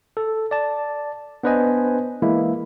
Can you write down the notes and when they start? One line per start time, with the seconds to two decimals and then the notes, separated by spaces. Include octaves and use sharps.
0.17 A4
0.51 D5 A5
1.43 B3 D4 B4 C5 D#5 G#5
2.22 E3 G#3 A#3 E4